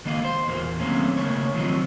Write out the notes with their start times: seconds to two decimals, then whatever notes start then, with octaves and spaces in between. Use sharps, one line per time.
0.05 C#2 D#3 A#3 D#5 F5
0.24 C5
0.47 E2 A#2 A#3
0.80 D#3 F#3 A3 A#3 C4 C#4
1.17 C#3 A3 A#3 C#5
1.54 D#3 F3 F#3 C4 D#4